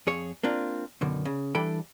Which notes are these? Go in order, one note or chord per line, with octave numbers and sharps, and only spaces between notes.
F2 G#4 C#5
A#3 C4 D4 F4
F#2 B2 D3 D#3
C#3
E3 G3 D4 A4 G5 B5